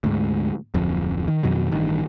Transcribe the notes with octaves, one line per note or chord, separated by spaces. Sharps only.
D2 G#2
D1 F2
D#3
F2 B2 D#3 F#3
A1 G2 D#3